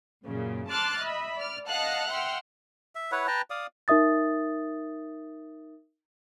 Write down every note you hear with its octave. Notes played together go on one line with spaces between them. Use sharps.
F#2 A#2 C#3
A5 C6 D6 F6 F#6 A6
D#5 E5 B5
D5 F6
D#5 F5 F#5 A5 F6 F#6
E5 F#5 G5 C6 F6
E5
E4 B4 C#5 F#5
B4 G5 A5 A#5
D5 F5 D#6
D#4 A#4 E5 D#6 A6